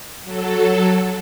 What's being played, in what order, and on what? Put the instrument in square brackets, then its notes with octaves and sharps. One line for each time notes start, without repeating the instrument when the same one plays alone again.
[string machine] F#3 A4